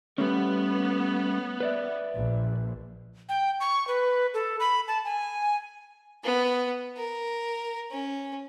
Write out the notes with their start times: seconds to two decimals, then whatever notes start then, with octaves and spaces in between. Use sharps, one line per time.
0.18 G3 A3 B3 C#4
1.60 B4 D5 E5
2.15 A#1
3.29 G5
3.60 C#6
3.88 B4
4.34 A4
4.60 B5
4.88 A5
5.05 G#5
6.24 B3
6.97 A#4
7.91 C#4